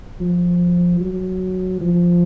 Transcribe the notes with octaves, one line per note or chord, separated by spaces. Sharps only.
F3
F#3
F3